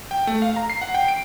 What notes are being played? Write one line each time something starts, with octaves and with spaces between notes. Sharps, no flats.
G5
A3
F5
A#5
C7
F#5
G5
D7